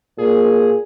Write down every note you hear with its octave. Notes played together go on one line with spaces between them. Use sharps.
A#2 G#4